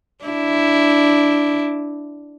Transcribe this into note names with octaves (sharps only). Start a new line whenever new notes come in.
D4 E4